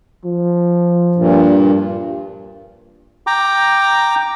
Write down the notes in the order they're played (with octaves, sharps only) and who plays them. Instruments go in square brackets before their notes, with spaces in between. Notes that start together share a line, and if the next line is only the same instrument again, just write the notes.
[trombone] F3
[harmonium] G2 A#2
[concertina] G5 A#5 D6